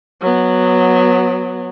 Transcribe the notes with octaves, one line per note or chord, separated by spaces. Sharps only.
F#3 B3